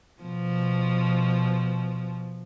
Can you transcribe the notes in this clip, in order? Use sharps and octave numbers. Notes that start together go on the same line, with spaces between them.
B2 F3